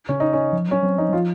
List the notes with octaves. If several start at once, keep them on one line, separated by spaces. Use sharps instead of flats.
C#3 C#4
D#4
C#4
F3
F#3 C#4
F#3 C4
F3 D#4
F#3
F3 F4